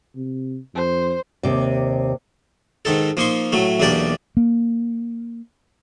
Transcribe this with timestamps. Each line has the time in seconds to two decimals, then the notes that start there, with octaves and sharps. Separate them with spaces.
0.16 C3
0.75 F2 C5
1.43 D#2 C3 D5
2.85 G#2 D#3 D#4 A4
3.17 F3 A#3 D#4 C6 C#6
3.52 A2 F#3 A3
3.80 B1 E2 A#3 D4 G4 D5
4.37 A#3